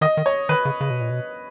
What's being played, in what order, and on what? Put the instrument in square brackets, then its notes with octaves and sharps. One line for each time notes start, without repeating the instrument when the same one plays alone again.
[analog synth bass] D#3 [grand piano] D#5
[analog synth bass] D#3
[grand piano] C#5
[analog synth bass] D#3 [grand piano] B4
[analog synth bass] C#3
C#3
B2
A#2
B2